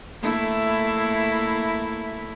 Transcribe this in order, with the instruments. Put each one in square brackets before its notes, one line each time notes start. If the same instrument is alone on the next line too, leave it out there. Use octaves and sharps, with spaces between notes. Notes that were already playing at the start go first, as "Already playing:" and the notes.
[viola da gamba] A3 A#3 E4